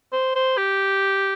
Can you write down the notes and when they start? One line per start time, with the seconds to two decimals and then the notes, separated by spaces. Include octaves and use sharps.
0.12 C5
0.35 C5
0.57 G4